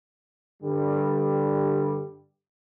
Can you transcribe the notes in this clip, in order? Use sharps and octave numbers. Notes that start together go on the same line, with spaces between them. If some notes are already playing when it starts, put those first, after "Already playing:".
G2 D3 G3 G4